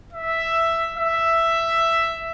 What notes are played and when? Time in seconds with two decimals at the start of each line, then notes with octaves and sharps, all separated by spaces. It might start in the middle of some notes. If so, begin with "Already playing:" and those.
0.13 E5
0.97 E5